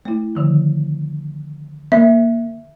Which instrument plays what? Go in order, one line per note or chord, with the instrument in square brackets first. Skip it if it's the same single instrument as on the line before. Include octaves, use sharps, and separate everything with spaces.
[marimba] A3 E4
D3 D#3 F3
[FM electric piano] A#3 [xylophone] E5